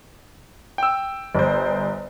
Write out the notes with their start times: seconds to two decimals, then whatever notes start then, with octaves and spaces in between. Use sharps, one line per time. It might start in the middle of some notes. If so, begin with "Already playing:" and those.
0.78 G5 E6
1.35 G1 C5